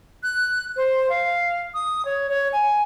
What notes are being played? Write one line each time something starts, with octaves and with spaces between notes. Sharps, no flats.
F#6
C5
F5
D#6
C#5
C#5
G#5